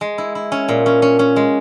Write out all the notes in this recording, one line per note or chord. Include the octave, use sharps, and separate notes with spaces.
G#3
E4
E4
C#4
A#2
C#4
C#4
C#4
G#3